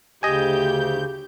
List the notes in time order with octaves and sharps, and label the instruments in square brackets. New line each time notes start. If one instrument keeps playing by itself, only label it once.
[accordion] D2 G6 [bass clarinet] C#3 [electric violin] G4 [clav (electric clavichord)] D#5 G#5